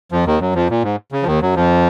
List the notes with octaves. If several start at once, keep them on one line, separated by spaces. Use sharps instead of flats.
F2 F3
D#2 D#3
F#2 F#3
F2 F3
A#2
G#2
C#3
F3
D#2 D#3
F#2 F#3
F2 F3